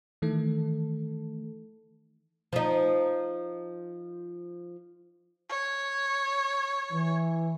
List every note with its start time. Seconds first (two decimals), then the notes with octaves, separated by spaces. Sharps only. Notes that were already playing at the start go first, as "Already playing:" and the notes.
0.22 D#3 E3 A3 A4
2.53 F3 D#4
5.49 C#5
6.93 E3